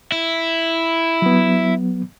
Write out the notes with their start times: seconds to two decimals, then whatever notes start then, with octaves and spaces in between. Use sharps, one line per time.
0.12 E4
1.22 F#3 B3